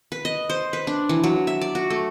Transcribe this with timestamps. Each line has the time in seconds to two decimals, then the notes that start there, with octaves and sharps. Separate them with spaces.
0.12 B4
0.25 D#5
0.50 C5
0.73 B4
0.87 D4
1.09 E3
1.24 F#3
1.47 E5
1.61 D5
1.75 F#4
1.90 A3